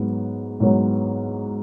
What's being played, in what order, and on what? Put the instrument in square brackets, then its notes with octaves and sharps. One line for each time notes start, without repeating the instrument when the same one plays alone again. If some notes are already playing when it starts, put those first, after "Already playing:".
Already playing: [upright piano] G#2 F#3 B3
G#2 F#3 B3